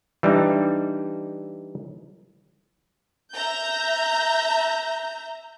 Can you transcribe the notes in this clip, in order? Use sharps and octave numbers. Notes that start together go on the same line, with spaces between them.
E3 G3 D4 D#4
E5 A#5 G6